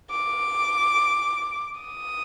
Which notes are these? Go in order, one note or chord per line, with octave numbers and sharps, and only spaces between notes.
D6
D#6